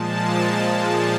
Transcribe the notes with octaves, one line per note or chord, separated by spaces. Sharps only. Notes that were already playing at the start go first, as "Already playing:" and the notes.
Already playing: A#2 F3 G#3 A5
A5